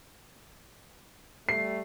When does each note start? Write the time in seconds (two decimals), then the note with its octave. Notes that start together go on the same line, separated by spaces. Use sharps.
1.49 G3 A3 C7